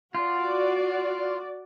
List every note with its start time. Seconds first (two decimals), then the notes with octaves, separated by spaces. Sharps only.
0.15 F4 F#4 D5